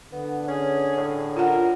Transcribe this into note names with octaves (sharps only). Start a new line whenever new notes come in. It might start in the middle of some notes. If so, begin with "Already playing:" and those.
D3 B3
C#4 G#4
A2
F4 A#4 F#5